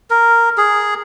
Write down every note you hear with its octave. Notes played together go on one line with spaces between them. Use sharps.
A#4
G#4